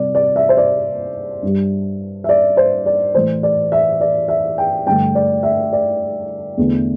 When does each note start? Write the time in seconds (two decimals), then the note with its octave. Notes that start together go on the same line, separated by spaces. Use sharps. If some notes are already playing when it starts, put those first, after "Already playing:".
Already playing: C3 G3 D5
0.15 D5
0.36 E5
0.49 C5
0.57 D5
1.43 G2 G3
2.24 E5
2.29 D5
2.57 C5
2.86 D5
3.15 A2 E3 A3 C5
3.43 D5
3.72 E5
4.01 D5
4.28 E5
4.58 G5
4.86 G2 D3 A3 G5
5.15 D5
5.43 E5
5.73 D5
6.58 E2 D3 A3